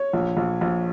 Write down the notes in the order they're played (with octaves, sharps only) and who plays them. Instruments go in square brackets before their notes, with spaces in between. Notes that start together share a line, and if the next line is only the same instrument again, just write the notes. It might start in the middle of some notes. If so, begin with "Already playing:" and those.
Already playing: [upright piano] C#5
A#1
A#1
A#1